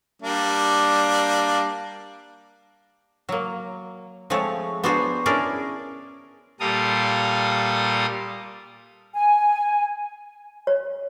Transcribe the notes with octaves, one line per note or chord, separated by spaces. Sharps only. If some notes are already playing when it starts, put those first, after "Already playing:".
G3 A#3 D4
F#3 A#3
F3 G#3 A3 C4 C#5
B3 D4 F#4 G#4 C5 C#5
C#4 D4 E4 G#4 A#4 D5
A#2 G3 A4 A#4 F5 D#6
G#5
C#5